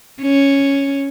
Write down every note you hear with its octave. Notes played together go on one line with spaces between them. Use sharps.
C#4